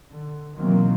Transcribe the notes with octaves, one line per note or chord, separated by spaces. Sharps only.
D3
B2 D#3 E3 F#3 A#3 C4